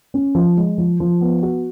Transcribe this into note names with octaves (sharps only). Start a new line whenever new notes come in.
C#4
F3
G#3
F3
F3
B3
F#4